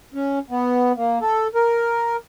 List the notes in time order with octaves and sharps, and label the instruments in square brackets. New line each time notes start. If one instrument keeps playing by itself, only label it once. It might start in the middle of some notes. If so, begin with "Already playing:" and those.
[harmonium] C#4
B3
A#3
A4
A#4